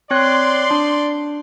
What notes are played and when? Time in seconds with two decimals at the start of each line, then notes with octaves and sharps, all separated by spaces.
0.11 C4 C#5 D5 C6 F#6
0.71 D4